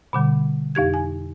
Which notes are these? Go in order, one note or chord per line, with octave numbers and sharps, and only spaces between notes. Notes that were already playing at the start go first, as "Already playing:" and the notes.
B2 D3 G3
F2 D#4 G4 G#6
G#5